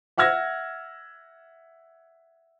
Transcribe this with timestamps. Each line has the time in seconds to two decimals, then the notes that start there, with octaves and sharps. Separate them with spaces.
0.18 E5 F#5 E6 F6 G#6 A#6